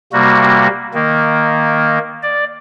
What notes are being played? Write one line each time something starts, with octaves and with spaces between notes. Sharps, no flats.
C3 G3 A#3 F#4
D#3 A#3
D5